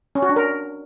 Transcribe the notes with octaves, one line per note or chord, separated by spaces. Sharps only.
C#4
F#4
D4
A#4